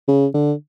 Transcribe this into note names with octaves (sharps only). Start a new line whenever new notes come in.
C#3
D3